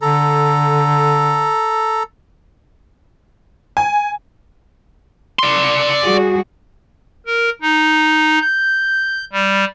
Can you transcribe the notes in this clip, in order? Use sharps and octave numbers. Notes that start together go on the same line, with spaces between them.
D3 A4 A#5
G#5
D5 C6
G3 F#4 G#4
A#4
D#4
G6
G3